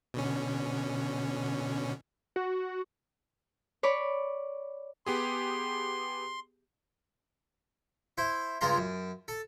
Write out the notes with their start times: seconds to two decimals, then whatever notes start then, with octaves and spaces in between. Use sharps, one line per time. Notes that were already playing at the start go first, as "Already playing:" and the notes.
0.14 B2 D3 C#4
2.36 F#4
3.83 C#5 D5 B5 C#6
5.06 B3 G4 G#4 C6
8.18 E4 C5
8.61 C#2 G2 G#3 F4 A#5 C6
8.78 F#2
9.28 A4